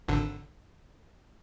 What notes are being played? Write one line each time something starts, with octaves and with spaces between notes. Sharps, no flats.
G#1 D3